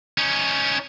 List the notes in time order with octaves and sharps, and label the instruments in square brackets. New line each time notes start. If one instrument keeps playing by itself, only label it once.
[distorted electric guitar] C#4 D#4